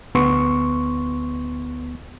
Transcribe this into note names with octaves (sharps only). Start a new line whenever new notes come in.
D2 B3 C6 C#6